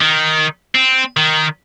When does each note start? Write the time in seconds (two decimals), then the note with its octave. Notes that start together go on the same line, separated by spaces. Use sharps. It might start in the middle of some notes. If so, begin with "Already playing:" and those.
0.01 D#3
0.75 C4
1.17 D#3